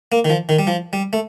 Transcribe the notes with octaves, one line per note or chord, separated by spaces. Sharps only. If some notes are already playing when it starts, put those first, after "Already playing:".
A#3
D#3
F3
D#3
G3
F3
G3
A3